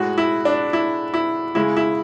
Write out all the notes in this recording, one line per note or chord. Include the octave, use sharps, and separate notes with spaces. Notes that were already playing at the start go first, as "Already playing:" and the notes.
Already playing: A2 G#3 F#4
E4
D4
E4
E4
C#3 G#3 E4
E4